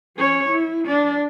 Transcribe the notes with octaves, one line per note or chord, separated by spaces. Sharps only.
C#4 C#5
E4
D4 D5